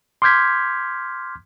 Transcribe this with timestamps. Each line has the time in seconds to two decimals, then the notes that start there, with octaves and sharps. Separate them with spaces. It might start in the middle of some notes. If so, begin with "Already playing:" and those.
0.22 C6 D6 F6 G6 G#6 B6